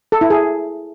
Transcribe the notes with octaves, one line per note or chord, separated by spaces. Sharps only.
A4
E4
G#4